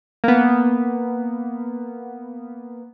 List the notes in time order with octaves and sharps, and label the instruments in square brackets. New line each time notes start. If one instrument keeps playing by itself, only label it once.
[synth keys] A#3 B3